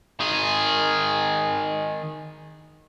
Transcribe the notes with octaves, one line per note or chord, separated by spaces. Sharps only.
D#3 G#4